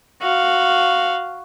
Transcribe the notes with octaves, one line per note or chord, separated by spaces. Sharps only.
F#4 F5